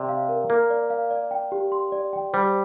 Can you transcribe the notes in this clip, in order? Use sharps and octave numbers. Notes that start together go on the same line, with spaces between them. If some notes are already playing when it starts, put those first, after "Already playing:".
Already playing: C3 D5
F5
A#4
A#3 A#4
D5
F5
D5
G5
G4
C6
D5
G5
G3 C5